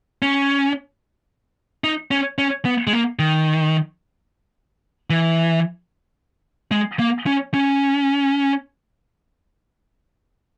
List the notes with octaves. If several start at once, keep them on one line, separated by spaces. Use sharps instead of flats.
C#4
D#4
C#4
C#4
B3
G#3
A#3
D#3
E3
G#3
A#3
C#4
C#4